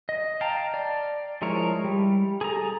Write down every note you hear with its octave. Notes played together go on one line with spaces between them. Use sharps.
D#5
F5 G5 A5 A#5
D5
F3 G#3 E4 A#4 C#5
G3
G#4 A4 A#5